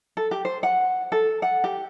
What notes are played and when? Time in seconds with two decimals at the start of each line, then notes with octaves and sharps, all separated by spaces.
0.17 A4
0.31 G4
0.45 C5
0.63 F#5
1.12 A4
1.42 F#5
1.64 G4